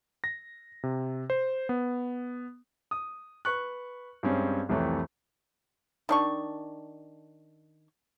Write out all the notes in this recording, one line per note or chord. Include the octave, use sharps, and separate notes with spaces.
A#6
C3
C5
B3
D#6
B4 C#6 F#6
G2 G#3 C4 C#4
C2 F2 E3 A3 C#5
D#3 D4 C#6